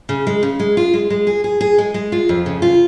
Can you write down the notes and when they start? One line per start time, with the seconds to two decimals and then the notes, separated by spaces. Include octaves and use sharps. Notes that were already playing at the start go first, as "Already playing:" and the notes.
0.09 C#3
0.27 G#3
0.43 C#3
0.60 G#3
0.77 F4
0.94 G#3
1.10 G#3
1.27 G#4
1.44 G#4
1.61 G#4
1.78 G#3
1.94 G#3
2.12 F4
2.29 F2
2.46 C#3
2.62 F4